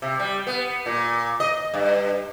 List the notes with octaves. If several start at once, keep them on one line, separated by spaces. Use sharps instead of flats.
C3
G3
B3
A#2
D#5
G2